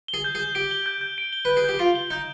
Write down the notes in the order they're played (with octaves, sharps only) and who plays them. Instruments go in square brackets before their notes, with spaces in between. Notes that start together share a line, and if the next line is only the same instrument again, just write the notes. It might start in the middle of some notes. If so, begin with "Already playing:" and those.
[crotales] G7
[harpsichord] G#4
[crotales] G6
[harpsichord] G#4
[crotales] G6
[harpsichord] G4 [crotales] D7
[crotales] G7
G6
G6
D7
G7
[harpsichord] B4 [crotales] G6
[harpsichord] G#4
[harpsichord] G4 [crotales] G6
[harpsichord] F4 [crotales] D7
[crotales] G7
[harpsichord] D#4 [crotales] G6